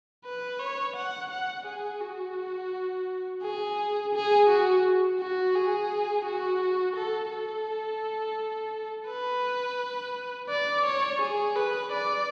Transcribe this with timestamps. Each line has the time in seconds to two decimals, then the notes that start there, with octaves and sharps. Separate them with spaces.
0.25 B4
0.59 C#5
0.96 F#5
1.30 F#5
1.66 G#4
2.01 F#4
3.42 G#4
4.14 G#4
4.49 F#4
5.20 F#4
5.55 G#4
6.25 F#4
6.96 A4
7.31 A4
9.08 B4
10.49 D5
10.85 C#5
11.21 G#4
11.56 B4
11.92 D5